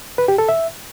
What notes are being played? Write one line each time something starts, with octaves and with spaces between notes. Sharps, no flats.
B4
G4
A4
E5